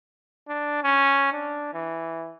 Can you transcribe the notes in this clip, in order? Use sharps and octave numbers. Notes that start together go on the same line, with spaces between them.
D4
C#4
D4
E3